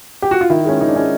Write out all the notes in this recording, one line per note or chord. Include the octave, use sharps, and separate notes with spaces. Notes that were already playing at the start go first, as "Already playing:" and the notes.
G4
F#4
F4
D#3 E4
G#3 C#4
D#3 D#4
D4
G#3 C#4 D#4